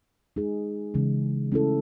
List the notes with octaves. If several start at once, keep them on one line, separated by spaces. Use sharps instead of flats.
G#3 D#4 G#4
C#3 E3 G#3 C#4
A3 C#4 E4 A4